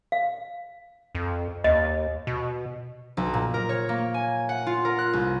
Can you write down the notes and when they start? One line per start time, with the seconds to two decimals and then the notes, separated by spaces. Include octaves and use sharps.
0.12 F5
1.15 F2
1.64 D#2 D#5
2.27 B2
3.17 B1
3.34 A#2
3.54 A#4
3.69 C#5
3.89 A#3
4.14 G#5
4.49 F#5
4.67 F4
4.85 A#4
4.99 F#6
5.13 C2